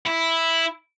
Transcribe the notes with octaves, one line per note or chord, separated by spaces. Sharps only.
E4